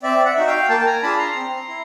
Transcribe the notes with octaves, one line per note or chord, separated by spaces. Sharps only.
C4 D5 E5
E5 F#5
D#4 F#4
F5 G5
A#3 G5 A5
A5
G#5 A#5
D4 F4 G#4 A5 B5
A#5 C6
C4
E4